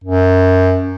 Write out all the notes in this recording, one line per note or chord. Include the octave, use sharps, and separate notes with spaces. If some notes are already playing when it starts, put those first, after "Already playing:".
F#2